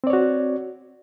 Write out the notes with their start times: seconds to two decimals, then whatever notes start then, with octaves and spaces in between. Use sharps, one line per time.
0.04 C4
0.07 D5
0.10 C#5
0.13 F#4